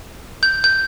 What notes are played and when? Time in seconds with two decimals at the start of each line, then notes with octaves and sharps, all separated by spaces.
0.43 G6
0.64 G6